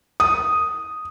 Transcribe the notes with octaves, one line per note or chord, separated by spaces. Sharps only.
D#6